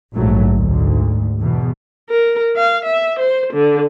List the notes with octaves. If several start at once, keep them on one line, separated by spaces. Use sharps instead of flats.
A#1 G#2 F#3 A3
D2 G#2
E2 B2
A#4
F5
E5
C5
D3